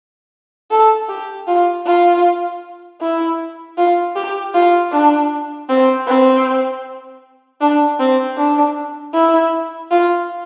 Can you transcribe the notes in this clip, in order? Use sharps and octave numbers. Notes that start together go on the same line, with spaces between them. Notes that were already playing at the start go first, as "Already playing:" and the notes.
A4
G4
F4
F4
E4
F4
G4
F4
D4
C4
C4
D4
C4
D4
E4
F4